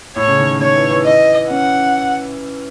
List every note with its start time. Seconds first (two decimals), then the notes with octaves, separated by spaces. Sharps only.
0.16 A2 C#5
0.27 C#3
0.38 D#3
0.60 D#3 C#5
0.76 E3
0.90 E3
1.05 D#5
1.49 C#4 F#5